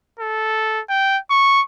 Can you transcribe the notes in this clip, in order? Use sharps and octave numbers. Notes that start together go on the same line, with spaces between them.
A4
G5
C#6